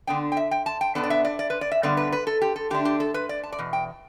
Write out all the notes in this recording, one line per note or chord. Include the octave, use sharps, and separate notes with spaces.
D3 B3 D4 G5
G5
E5
G5
A5
G5
B2 G3 B3 D4 A4
D5
E5
D5
D5
B4
D5
E5
G2 D3 G3 B3 D5
B4
B4
A4
G4
A4
D3 A3 D4 G4
G4
A4
B4
D5
A5
D5
E2 B2
G5